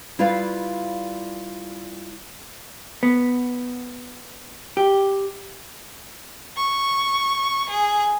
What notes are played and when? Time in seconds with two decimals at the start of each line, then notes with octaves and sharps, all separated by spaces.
0.19 G3 E4 F4 B4 D5 F5
3.03 B3
4.77 G4
6.56 C#6
7.69 G#4